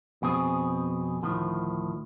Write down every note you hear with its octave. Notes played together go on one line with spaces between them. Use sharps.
F2 B2 C4 G#4 G#5
D2 A2 D#3 F3